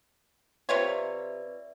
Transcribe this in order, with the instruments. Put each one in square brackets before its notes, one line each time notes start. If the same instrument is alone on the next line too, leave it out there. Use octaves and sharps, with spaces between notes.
[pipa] C3 F4 C#5 [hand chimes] B4 D5 E5